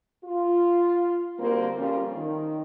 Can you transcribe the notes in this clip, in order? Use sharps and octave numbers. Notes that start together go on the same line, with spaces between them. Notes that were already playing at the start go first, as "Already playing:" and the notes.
F4
D3 G3 A#3 C4 F#4 A#4
F2 G3 C#4 F4
D#3